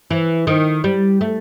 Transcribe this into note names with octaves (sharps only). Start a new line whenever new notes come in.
E3
D#3
G3
A3